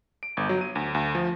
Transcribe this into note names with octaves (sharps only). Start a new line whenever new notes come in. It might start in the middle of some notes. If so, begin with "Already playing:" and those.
D7
G1
F#3
D#7
D2
D2
F3